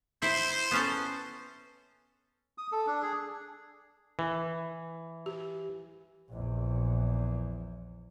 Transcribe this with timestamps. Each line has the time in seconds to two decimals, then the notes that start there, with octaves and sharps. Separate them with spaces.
0.22 E4 C5
0.71 B3 C#4 A4
2.58 D#6
2.72 A4
2.87 D4
3.02 G#4
4.19 E3
5.26 G4
6.29 A#1 E2